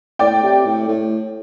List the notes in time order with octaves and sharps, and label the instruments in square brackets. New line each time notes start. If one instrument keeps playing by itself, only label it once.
[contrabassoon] A2 [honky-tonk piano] D5 G5
[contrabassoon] C3
A2
A2